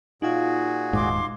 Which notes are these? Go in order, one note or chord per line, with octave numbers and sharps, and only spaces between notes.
A#2 D#4 F4 F#4 G#4 F5
D#1 G#2 C6 D6